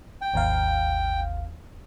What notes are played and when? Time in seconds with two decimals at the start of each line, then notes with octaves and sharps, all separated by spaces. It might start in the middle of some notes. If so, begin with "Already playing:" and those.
0.21 G5
0.33 G#1 D#2 F5